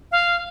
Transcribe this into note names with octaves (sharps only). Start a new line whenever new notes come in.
F5